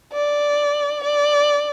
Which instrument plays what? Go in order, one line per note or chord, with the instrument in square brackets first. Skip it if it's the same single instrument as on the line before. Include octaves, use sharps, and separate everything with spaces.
[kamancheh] D5
D5